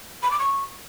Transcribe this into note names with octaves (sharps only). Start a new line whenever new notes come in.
B5
D6
C#6